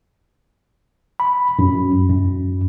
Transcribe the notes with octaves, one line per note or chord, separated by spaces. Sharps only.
B5
F#2
F#2